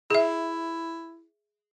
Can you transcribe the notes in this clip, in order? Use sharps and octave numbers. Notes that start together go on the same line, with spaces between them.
E4 G#4 E5